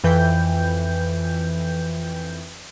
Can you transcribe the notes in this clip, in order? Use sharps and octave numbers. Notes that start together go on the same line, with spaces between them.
F2 E3 B4 G5 G6